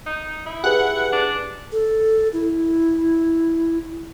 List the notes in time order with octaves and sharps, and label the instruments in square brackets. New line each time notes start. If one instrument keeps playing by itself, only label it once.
[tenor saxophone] D#4
E4
[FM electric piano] G4 G#4 B4 [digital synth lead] F#5
[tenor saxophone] D4
[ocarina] A4
E4